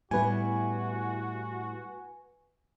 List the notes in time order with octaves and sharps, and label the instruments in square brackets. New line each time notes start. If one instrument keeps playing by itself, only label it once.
[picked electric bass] A2 [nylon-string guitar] G3 B3 E4 [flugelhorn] F#4 [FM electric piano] B4 G#5